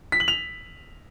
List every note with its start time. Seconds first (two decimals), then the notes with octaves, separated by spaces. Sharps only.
0.12 B6
0.20 F#7
0.28 F7